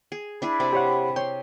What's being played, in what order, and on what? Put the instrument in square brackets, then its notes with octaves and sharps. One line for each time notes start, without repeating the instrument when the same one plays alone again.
[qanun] G#4
[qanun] D4 E4 G#4 [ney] B5
[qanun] C3 D5
[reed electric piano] G4 C#5 F#5
[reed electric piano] C#5 G5 [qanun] C6